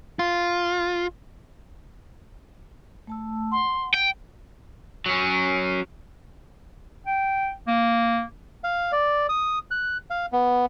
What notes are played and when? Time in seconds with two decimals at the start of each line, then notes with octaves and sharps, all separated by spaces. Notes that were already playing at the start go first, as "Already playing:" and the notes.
0.19 F4
3.07 A3 A5 E6
3.52 F#5 C6
3.94 G5
5.06 F#3 C#4
7.07 G5
7.67 A#3
8.64 F5
8.92 D5
9.29 D#6
9.71 F#6
10.10 F5
10.32 B3